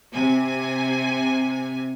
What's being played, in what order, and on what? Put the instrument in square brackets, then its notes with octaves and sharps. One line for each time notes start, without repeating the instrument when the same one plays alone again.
[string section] C3 G#5